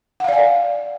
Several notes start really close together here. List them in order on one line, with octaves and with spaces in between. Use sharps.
F#5 F5 D5 G#5